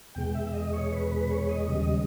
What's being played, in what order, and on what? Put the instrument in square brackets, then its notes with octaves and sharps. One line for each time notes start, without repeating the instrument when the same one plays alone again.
[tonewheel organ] E2 B2 G#3 G5
E5
D#5
C#5
B4
B4
C#5
D#5
D#2 C#3 G3 D#5